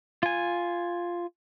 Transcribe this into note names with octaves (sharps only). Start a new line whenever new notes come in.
F4 G#5